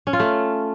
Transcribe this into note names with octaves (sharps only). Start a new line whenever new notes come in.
C#4
F4
A3